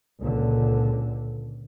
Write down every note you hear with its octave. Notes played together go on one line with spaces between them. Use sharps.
C#2 A#2 D3